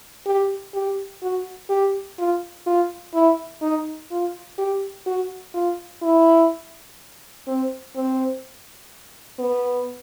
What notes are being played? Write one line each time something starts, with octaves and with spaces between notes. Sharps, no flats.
G4
G4
F#4
G4
F4
F4
E4
D#4
F4
G4
F#4
F4
E4
C4
C4
B3